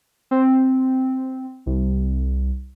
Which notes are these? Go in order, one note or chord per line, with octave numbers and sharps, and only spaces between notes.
C4
C2